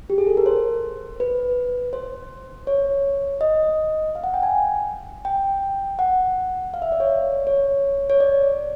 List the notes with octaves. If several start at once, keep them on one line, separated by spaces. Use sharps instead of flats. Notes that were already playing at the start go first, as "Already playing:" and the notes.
G4
G#4
A4
A#4
C5
B4
C5
C#5
D#5
F5
F#5
G5
G#5
G5
F#5
F5
E5
D5
C#5
C#5
C#5
D5